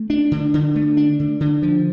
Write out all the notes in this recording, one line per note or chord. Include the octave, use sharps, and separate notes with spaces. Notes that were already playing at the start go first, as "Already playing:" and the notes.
Already playing: A3
D4
D3
D3
A3
D4
D3
D3
F3